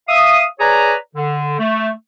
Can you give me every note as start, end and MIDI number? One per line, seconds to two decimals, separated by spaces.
0.08 0.43 76
0.08 0.43 77
0.08 0.43 87
0.59 0.94 68
0.59 0.94 71
0.59 0.94 73
0.59 0.94 74
0.59 0.94 80
0.59 0.94 82
1.15 1.58 50
1.59 1.89 57